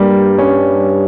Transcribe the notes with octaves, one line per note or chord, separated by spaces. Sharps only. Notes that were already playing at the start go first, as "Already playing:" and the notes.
Already playing: G2 G3 A#3
C#4